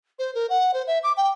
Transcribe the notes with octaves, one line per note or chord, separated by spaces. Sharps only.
C5
A#4
F#5
C5
E5
D6
G5